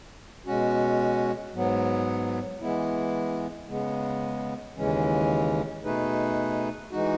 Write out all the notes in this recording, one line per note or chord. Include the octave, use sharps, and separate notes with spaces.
B2 G#3 C#4 F#4
G#2 F#3 B3
E3 G#3 B3 E4
C#3 G#3 B3
D#2 C#3 E3 G#3 C#4
B2 A3 D#4 G#4 B4
E3 G#3 D#4 F#4